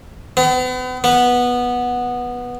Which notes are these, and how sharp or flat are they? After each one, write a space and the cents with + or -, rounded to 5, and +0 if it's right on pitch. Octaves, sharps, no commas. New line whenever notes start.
B3 +40
B3 -10